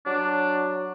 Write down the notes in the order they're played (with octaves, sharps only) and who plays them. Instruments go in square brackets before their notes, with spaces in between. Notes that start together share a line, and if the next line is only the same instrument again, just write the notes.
[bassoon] F#3 [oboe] D4